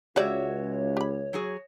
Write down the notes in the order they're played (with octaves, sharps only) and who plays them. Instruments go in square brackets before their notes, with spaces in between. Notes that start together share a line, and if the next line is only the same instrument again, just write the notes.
[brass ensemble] C#2 [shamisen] C#3 G4 D5 [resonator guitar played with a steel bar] F#4 E5 [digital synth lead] C#5
[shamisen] G4 B5
[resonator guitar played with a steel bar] F#3 F#4 G#4